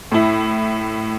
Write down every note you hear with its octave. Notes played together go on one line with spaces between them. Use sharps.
A2 E4